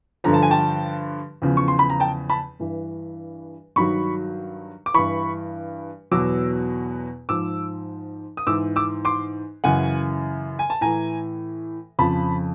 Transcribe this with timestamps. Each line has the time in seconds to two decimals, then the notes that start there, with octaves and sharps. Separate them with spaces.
0.24 G2 D3 F3 A#5
0.34 A5
0.43 G#5
0.51 G5 A5
1.42 E2 C#3 F3
1.57 C#6
1.68 C6
1.79 B5
1.90 A#5
2.00 G5 A5
2.30 A5 B5
2.60 G2 E3
3.76 G2 D#3 F#3 B5 C#6
4.86 D6
4.94 G2 E3 B5 C#6
6.11 E2 B2 F#3 D6 E6
7.29 G#2 F3 D6 E6
8.37 D#6
8.47 G#2 E3 D6 E6
8.76 D6 E6
9.05 C6 D6
9.64 F#2 C#3 E3 F#5 G#5
10.59 G#5
10.70 A5
10.81 A2 E3 G#5 A#5
11.99 F2 C#3 F3 A5 B5